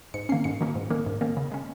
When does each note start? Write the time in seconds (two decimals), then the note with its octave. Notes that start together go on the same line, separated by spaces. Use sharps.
0.14 G#2 C#7
0.29 D#3 A#3 C#4 C7
0.44 G#2 C#7
0.61 D#3 A#3 C#4
0.76 G#2
0.91 D#3 A#3 C#4
1.06 G#2
1.21 D#3 A#3 C#4
1.37 C#3
1.52 G#3 C#4